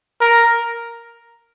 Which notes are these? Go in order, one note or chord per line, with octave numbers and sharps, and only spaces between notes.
A#4